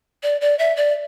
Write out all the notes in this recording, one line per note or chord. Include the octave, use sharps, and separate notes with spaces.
D5
D5
E5
D5